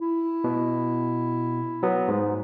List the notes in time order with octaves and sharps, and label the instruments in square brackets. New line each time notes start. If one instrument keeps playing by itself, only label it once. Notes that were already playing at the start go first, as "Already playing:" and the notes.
[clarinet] E4
[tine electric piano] B2
F#3 B3
G#2